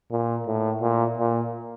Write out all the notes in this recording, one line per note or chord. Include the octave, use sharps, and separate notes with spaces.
A#2
A2
A#2
A#2